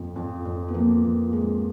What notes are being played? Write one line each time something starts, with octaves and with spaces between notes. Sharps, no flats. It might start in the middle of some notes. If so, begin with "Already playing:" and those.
Already playing: F2 F3
F2
F2
B3
F3 A#3
F2
G#3